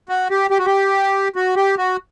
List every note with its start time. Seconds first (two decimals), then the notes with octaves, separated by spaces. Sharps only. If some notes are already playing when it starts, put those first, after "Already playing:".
0.09 F#4
0.31 G4
0.51 G4
0.59 F#4
0.66 G4
1.36 F#4
1.56 G4
1.78 F#4